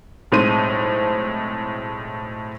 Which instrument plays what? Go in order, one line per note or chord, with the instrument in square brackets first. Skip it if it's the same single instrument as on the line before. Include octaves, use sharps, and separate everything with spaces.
[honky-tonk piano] B1 A2 G#3 C4 C5 D#7